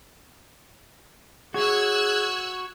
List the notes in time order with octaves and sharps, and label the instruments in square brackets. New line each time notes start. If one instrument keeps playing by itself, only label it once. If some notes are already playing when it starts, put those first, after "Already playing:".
[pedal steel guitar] F#4 C#5 [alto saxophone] G#4 [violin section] E6 F#6 G#6